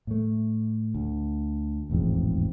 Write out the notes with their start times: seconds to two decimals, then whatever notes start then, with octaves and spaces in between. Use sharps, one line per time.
0.07 A2 A3
0.95 D2
1.90 E1 A1 F2 G#2